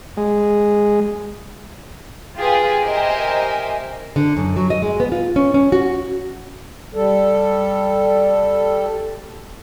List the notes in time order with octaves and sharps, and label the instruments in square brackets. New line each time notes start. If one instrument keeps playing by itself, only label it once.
[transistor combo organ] G#3
[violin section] F4 G4 G#4 B4
G4 A#4 C5 D#5 E5 G#5
[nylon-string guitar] D3
F#2
F#3
D#5
G#3
B3
F4
C#4
C#4
F#4
[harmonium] G3 A4